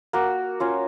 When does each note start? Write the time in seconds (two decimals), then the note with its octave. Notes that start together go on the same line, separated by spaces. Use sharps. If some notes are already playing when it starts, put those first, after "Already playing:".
0.13 A#3 F#4
0.60 C#4 F4